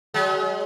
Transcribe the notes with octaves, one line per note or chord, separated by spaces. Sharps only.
F#3 G#3